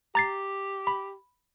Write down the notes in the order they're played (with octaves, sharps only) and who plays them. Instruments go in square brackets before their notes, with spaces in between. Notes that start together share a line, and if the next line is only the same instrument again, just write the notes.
[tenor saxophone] G4 [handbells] A#5 A6 C7
[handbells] B5